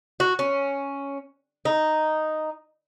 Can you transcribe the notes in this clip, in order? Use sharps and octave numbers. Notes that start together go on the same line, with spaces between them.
F#4
C#4
D#4